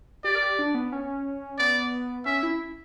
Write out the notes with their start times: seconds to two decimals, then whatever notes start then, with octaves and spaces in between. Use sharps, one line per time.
0.24 G4 D5
0.35 A#4
0.42 G4
0.59 D4
0.75 B3
0.92 C#4
1.59 B3 D5
2.26 C#4 E5
2.43 E4